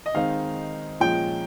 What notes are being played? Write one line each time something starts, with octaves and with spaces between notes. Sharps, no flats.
D#5
D#3 G#3 C4 D#4 F5
A#2 F3 G#3 C#4 G5